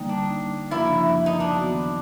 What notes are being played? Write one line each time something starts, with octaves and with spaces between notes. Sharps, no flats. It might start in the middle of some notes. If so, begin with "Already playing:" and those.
Already playing: D3 G3 A#3 D#4
D4
F#2 C#3 F3 A#3 D4 E4
D#4
D4
D#3 F#3 B3 D#4 F#4